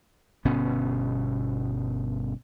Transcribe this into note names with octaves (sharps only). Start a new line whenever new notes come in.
G1 B2 B3 C#4